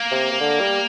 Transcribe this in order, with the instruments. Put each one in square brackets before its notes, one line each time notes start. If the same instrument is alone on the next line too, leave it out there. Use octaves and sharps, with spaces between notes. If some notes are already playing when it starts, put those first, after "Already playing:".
Already playing: [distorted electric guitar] A#3
[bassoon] C3
C3
D3
G3